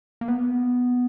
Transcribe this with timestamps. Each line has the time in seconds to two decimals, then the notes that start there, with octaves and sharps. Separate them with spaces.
0.21 A#3
0.28 B3